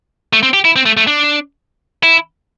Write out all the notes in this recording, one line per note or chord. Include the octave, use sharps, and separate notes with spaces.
A3
C4
G4
E4
C4
A3
A3
D4
E4